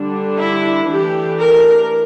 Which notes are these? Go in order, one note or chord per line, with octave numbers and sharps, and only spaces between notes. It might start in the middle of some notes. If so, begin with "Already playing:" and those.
Already playing: D3 G3 D4
E4
E3 A3 D4 G4
A#4